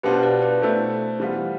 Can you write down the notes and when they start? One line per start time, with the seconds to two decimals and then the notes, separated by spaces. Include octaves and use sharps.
0.03 B2 B3 D4 F4 G4 B4 C5
0.22 B4 D5
0.42 B4 D5
0.62 B2 A3 E4 A4 C5
1.20 E3 G3 B3 F4